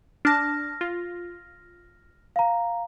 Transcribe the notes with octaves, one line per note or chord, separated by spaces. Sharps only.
D4 A5 F6 A#6
F4
F5 A#5